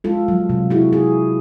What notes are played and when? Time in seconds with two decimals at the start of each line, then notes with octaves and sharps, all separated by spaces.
0.04 G#3 F4 A4
0.28 F#3
0.50 C3
0.70 E4 F#4 G#4
0.93 G#4